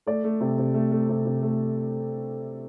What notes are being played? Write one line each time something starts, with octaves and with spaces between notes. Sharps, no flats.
A3 D5
A3
C3
C3
A3
A3
C3
C3
A3